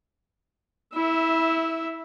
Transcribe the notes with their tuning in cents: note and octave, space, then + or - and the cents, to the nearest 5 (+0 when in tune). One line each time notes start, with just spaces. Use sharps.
E4 -20 E5 +0